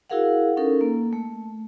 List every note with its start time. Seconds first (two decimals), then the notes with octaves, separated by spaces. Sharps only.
0.10 E4 F#4 G#4 A#4 F5 F#5
0.57 C#4 D#4 A4 A#4
0.81 A#3
1.13 A3